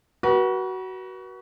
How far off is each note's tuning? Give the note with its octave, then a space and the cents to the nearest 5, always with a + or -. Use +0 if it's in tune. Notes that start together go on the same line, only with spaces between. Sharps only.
F#4 +20 B4 -40